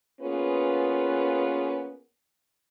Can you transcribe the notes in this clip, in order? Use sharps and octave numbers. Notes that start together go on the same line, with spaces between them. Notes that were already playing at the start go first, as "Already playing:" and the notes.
A#3 B3 C#4 F4 G#4 B4